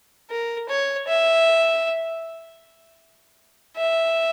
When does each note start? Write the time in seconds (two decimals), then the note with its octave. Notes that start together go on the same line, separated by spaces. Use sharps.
0.30 A#4
0.69 C#5
1.07 E5
3.77 E5